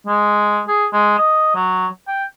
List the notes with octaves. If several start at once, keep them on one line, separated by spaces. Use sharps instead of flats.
G#3
G#4
G#3
D#5
F#3
G5